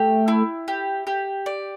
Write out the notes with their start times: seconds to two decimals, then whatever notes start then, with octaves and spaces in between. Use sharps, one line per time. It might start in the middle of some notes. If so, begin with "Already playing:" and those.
Already playing: A3 G4
0.28 E4
0.68 G4
1.07 G4
1.46 D5